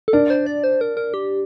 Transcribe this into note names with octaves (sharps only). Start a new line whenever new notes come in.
A4
D4 A#4
C5
D5
C5
A#4
A#4
G4